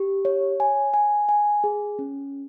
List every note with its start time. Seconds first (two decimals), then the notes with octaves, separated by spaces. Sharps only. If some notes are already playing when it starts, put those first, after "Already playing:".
Already playing: G4
0.25 C#5
0.60 G#5
0.94 G#5
1.29 G#5
1.64 G#4
1.99 C#4